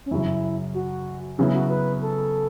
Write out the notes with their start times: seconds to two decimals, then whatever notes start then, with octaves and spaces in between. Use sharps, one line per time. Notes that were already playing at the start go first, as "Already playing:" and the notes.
0.06 C#4
0.11 F#2 C#3 F#3 E4
0.74 F#4
1.38 C#3 F#3 B3 C#4 E4
1.54 F#4
1.70 B4
2.02 A4